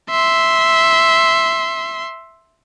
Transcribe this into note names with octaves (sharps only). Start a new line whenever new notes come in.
E5 C6